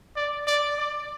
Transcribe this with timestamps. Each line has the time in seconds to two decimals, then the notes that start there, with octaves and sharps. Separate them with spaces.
0.16 D5
0.47 D5
0.78 D5